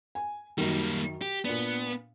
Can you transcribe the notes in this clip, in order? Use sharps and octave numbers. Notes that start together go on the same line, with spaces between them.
G#5
F#2 D#3 G3 A#3
G4
A#2 B3 D4